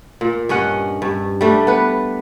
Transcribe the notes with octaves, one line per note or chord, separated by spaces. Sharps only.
A#2
G2 C#4 D#5 F#5
G2
G3 A3 D4
B3 B4